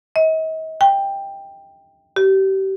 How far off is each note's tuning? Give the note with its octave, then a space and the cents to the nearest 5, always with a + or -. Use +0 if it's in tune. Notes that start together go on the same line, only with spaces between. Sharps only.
D#5 +40
G5 +10
G4 -30